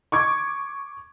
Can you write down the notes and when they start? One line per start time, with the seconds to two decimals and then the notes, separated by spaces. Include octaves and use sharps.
0.12 C#6 D6 G#6